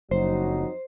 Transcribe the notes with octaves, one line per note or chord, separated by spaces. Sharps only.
F#1 F2 F#3 D#4 C5